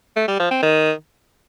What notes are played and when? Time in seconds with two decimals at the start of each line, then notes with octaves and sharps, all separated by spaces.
0.16 A3
0.28 G3
0.40 F3
0.51 C4
0.63 D#3